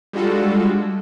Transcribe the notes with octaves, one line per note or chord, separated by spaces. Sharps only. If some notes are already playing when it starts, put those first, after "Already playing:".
G3 G#3 D4 F4 F#4 A4